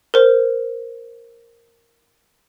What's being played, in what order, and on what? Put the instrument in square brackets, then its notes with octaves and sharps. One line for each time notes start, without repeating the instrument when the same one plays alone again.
[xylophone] A#4 C5